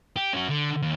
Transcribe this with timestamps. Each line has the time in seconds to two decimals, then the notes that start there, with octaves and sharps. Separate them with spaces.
0.16 G4
0.33 C#4 F#4
0.49 D3
0.82 D#2